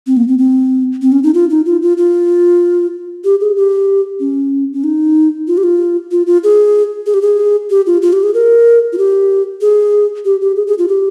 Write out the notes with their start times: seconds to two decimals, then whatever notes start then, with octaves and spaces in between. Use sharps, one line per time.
0.07 C4
0.17 A#3
0.28 C4
0.39 C4
1.02 C4
1.12 C#4
1.23 D#4
1.34 F4
1.50 D#4
1.66 F4
1.82 F4
1.97 F4
3.24 G4
3.41 G#4
3.56 G4
4.20 C#4
4.73 C#4
4.84 D#4
5.48 F4
5.58 G4
5.63 F4
6.12 F4
6.27 F4
6.44 G#4
7.06 G#4
7.14 G4
7.22 G#4
7.70 G4
7.86 F4
8.02 F4
8.13 G4
8.23 G#4
8.34 A#4
8.93 F4
8.98 G4
9.61 G#4
10.25 G4
10.41 G4
10.56 G#4
10.67 G#4
10.78 F4
10.88 G4